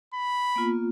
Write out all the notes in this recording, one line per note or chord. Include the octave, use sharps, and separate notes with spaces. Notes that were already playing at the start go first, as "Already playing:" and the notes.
B5
A#3 B3 F4